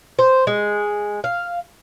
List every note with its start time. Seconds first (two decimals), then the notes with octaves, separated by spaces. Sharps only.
0.19 C5
0.47 G#3
1.24 F5